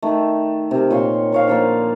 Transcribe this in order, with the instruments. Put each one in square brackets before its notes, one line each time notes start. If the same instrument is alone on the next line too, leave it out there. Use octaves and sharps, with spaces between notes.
[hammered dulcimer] D#3 A3
C3 A#4
A#2 C#5 F5 C6
C5 C#5 F5
D3 F3 A#3